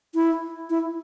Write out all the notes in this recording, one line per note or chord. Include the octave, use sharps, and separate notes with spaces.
E4
E4